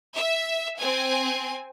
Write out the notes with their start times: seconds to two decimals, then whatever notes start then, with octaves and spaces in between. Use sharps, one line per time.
0.15 E5
0.78 C4 G#5